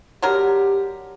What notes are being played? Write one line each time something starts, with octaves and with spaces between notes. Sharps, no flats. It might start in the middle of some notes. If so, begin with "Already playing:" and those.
D3 F#3 G4 A#4